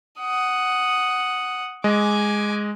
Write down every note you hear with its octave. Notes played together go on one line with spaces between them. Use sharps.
F#5 D#6
G#3 D#5 G#5 D6